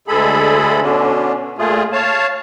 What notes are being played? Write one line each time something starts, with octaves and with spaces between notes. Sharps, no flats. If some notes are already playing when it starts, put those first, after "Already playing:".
D2 G#3 G#4 A4 B5
B2 D3 C#4 D4
A#2 A3 F4 G#4
C#5 F5 A5